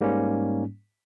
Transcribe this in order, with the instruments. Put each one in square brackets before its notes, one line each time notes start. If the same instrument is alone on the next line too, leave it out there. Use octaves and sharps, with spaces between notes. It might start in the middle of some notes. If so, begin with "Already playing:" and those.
[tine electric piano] G#2 G3 A#3 C#4